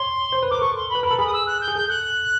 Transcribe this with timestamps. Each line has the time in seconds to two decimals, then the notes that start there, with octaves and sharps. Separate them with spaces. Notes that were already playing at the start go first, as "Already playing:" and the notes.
Already playing: C#5 C6
0.32 C5
0.43 B4
0.50 A#4 D6
0.61 A4 C#6
0.76 C6
0.90 B5
0.95 B4
1.03 A#4 B5
1.11 A4
1.18 G#4 B5
1.27 D#6
1.33 E6
1.47 F#6
1.61 G6
1.68 G#4
1.75 A4 G6
1.89 F#6